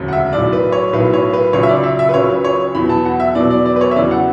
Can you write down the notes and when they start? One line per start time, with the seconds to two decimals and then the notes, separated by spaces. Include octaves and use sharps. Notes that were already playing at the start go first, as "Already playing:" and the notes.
Already playing: E1 D2 C#3 F#3
0.08 F#5
0.13 E5
0.33 B1 A2 F#3 D5
0.52 B4
0.72 C#5
0.93 B1 A2 F#3 B4
1.13 C#5
1.33 B4
1.53 C#2 C#3 F#3 C#5
1.63 E5
1.69 D5
1.84 E5
1.99 E5
2.09 B4
2.14 C#2 C#3 F#3 C#5
2.30 B4
2.44 C#5
2.75 E2 B2 F#3 B5
2.89 A5
3.05 F#5
3.20 E5
3.35 E2 B2 F#3 D5
3.50 D5
3.66 D5
3.76 B4
3.81 C#5
3.91 E5
3.96 E2 C#3 F#3 D5
4.11 F#5